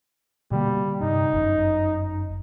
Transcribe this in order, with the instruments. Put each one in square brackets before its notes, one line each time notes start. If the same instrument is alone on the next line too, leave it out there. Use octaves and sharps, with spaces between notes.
[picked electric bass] B2 D3 A#3 [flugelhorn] G3
[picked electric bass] G2 C3 [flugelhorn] D#4
[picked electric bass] G1 F#2